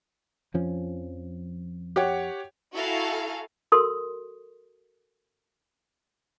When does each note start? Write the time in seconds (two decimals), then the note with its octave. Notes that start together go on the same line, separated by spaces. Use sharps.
0.54 F2 F3 C#4
1.96 G4 C#5 F#5
2.74 E4 F#4 A4 F5 G#5 A#5
3.72 F#4 A4 A#4 C6 D#6